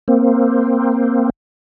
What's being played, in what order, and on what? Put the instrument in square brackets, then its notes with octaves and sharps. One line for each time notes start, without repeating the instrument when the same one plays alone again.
[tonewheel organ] A#3 C4